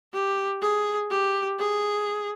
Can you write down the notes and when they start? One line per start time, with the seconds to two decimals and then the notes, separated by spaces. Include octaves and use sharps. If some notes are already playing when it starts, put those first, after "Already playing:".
0.13 G4
0.62 G#4
1.10 G4
1.59 G#4